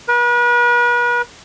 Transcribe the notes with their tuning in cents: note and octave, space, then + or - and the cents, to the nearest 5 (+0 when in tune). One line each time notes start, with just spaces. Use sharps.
B4 -40